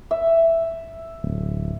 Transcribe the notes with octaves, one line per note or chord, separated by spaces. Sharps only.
E5
D1